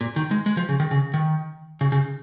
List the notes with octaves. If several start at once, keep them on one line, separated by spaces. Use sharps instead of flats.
A#2
D#3
G#3
G#3
F3
C#3
D#3
C#3
D#3
C#3
C#3